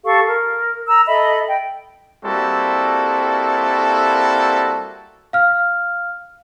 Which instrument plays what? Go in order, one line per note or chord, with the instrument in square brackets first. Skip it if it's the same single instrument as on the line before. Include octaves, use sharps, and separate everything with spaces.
[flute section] G4 A4 F5 C#6
A#4
A#5 E6
A4 D#5 E5 B5
G5
[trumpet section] G3 A#3 C4 E4 F#4 A4
[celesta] F5 F6